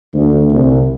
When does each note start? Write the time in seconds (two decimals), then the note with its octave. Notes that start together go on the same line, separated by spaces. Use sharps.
0.14 D2
0.51 C2